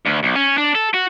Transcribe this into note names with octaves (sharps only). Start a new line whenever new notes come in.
D2
B1
C#4
D4
A4
F#4